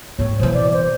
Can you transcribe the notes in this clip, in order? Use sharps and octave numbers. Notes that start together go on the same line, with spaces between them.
G#2 C4 C#5
B2 E3 C5
D5
C5